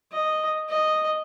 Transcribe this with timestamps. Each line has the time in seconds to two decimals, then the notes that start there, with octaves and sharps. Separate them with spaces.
0.12 D#5
0.69 D#5